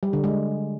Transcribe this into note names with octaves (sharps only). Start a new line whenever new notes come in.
G3
D3
G#3